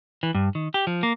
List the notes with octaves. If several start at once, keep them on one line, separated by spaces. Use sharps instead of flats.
E3
G2
D#3
G4
F3
A#3